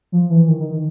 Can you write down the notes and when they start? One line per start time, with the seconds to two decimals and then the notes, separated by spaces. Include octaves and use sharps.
0.12 F3
0.30 E3
0.48 D#3
0.60 D#3
0.70 D#3